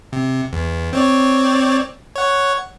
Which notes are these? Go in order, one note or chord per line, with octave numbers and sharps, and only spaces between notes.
C3
E2
C4 C#5 D5
C#5 F#5